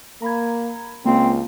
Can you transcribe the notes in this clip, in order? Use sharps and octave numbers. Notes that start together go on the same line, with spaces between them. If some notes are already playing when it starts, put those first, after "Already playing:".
A#3 A#5 B5 G#6
C#2 A#3 C4 F4